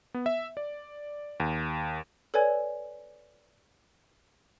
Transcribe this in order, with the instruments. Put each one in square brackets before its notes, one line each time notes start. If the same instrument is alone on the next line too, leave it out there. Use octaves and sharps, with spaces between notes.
[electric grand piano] B3
E5
D5
D#2
[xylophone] A4 B4 C#5 D5 G#5 G#6